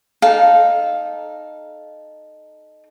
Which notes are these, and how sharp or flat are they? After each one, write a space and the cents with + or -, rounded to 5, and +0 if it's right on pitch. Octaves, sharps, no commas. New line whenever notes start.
D#4 -15 A4 -15 F5 +0